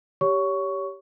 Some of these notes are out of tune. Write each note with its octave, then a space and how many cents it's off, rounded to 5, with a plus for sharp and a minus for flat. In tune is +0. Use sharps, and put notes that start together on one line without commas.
G4 +0 C#5 +20 C#6 +10